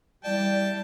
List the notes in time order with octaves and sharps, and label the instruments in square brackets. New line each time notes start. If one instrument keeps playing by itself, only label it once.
[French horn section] E2 E4 D5 [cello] G3 [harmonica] G5 A5